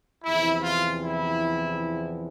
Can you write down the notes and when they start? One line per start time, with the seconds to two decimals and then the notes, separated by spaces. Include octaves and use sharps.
0.24 E2 C3 F3 E4
0.62 F4
1.01 E4